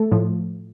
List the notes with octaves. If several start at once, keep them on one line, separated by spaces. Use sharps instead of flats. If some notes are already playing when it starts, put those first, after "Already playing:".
Already playing: A3 A4
A2 F3